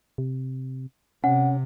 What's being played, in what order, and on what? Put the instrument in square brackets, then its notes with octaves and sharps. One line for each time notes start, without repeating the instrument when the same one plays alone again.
[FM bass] C3
[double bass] C3 [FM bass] C#4 [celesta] F#5